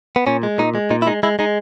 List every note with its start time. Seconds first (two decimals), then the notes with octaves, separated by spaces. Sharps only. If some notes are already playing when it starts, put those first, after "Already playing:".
0.16 B3
0.27 A#2 C#4
0.43 G#3
0.58 A#2 D#4
0.75 G#3
0.90 A#2 D#4
1.02 E4
1.07 G#3 D#4
1.23 G#3 E4
1.39 G#3 D#4